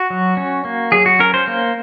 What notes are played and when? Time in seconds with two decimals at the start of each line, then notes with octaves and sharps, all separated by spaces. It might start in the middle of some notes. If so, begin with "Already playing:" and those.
Already playing: F#4
0.10 F#3
0.37 C#4
0.65 A#3
0.92 F#3 G#4
1.06 F#4
1.19 C#4 A#4
1.34 C5
1.48 A#3